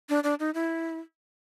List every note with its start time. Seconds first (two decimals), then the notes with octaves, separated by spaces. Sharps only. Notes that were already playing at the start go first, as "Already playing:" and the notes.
0.09 D4
0.24 D4
0.40 D#4
0.54 E4